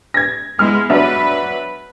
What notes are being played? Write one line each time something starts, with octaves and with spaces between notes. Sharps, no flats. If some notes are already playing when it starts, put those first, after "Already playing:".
G#6 A#6
G#3 B3 E4 F6
F#3 D4 B4 E5